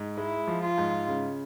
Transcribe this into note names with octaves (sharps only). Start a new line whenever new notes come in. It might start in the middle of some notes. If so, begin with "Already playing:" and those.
Already playing: G#2
G#3 E4
F3
F4
G#2
C#3